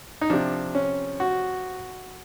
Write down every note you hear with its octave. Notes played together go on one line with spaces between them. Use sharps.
D#4
C3 F3 D4
C#4
F#4